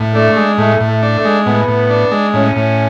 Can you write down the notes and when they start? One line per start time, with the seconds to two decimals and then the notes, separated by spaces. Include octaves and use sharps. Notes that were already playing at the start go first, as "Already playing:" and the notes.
Already playing: A2
0.14 A3 D4
0.36 G#3
0.58 A2 A3
0.80 A2
0.88 A3
1.03 D4
1.17 A3
1.25 G#3
1.46 A2 B3
1.68 A2
1.90 D4
2.11 G#3
2.33 A2 C#4
2.56 A2